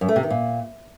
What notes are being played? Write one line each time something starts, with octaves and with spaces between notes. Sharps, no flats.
F#2
A3
C3
D#3
A#2